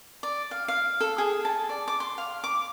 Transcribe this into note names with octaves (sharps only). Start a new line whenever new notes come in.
D5
F5
F5
A4
G#4
A5
D5
D6
C6
F5
D6